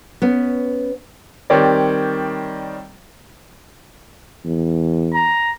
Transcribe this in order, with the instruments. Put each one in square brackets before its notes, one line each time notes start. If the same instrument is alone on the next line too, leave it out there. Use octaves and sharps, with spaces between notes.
[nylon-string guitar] B3 C#4
[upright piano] D#3 G3 C4 C#5 D5
[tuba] E2
[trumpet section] A#5